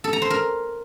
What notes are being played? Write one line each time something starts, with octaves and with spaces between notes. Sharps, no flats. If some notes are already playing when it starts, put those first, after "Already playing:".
A4
A#5
C5
A#4